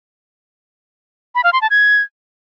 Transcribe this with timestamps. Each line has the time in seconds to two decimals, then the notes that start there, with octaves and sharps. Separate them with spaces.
1.35 B5
1.44 F5
1.53 C6
1.61 A5
1.70 G#6